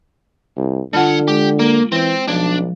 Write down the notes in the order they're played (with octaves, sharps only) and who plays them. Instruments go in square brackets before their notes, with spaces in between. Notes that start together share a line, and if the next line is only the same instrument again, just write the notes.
[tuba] C2
[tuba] D3 [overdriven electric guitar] G3 F#5 [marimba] F4 A5
[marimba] G#3 [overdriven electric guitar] G4
[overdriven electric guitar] A#3
[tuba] E3 [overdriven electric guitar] C4 C5
[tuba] B1 [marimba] F3 [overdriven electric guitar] D4